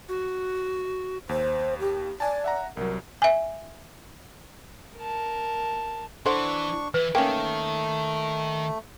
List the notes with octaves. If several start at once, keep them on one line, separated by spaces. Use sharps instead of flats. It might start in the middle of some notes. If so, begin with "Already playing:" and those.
F#4
D#2 C5
G4
D5 G#5 A5
E5 F#5 A#5
C2 F#3 A#4
E5 G#5
A#4 A5
D3 E3 D4 C5 F#5 C#6
E3 B4
D#3 A3 A#3 C#4 G5